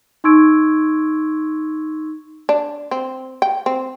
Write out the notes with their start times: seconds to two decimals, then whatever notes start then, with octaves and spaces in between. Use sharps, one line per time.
0.24 D#4 C6 C#6 E6 G#6 D7
2.49 D4
2.91 C4
3.42 G5
3.66 C4